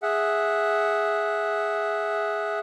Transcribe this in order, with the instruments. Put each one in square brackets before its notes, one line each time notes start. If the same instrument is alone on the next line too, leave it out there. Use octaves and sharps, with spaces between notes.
[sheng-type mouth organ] G#4 E5 F#5